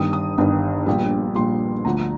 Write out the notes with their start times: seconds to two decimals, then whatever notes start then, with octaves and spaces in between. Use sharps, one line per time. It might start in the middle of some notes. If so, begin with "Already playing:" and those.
Already playing: G1 G2 D#3 G3 D#6
0.13 D#6
0.38 G1 G2 D#3 G3
0.86 A#1 A#2 G3
1.35 A#1 A#2 G3 C6
1.85 D2 D3 F3 A#5